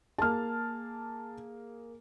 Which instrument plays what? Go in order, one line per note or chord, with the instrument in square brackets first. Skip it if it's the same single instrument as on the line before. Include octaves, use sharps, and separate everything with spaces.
[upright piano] A#3 G#4 [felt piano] A5 F6